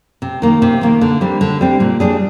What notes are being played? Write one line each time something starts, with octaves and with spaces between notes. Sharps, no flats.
C3
D#3 A#3
C3
D#3 A#3
D3
G3 C4
D3
G3 C4
A#2
G3 D4 G#4